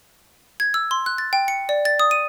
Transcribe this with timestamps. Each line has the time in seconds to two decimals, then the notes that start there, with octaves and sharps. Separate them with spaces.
0.60 G#6
0.74 E6
0.91 C6
1.06 F#6
1.18 A6
1.33 G5
1.48 C#7
1.69 D5
1.85 A6
2.00 D#6
2.11 D#7